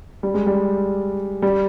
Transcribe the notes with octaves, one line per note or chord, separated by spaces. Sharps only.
G3
G#3
G3
G3